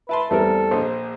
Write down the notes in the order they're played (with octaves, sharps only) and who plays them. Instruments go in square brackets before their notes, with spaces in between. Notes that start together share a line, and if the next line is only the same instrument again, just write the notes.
[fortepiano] E4 A5 C6 [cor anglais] B4
[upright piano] E2 G3 B3 [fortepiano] A3 C4 A#4 [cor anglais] A4
[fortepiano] A#1 A#3 D#5 [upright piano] C5